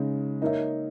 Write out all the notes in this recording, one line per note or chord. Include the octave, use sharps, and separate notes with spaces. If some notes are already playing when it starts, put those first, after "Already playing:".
Already playing: C#3 G#3 D#4
A#3 D#4 A#4 C#5 E5